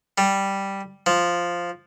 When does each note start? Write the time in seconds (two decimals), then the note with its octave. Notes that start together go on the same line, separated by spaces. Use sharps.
0.18 G3
1.06 F3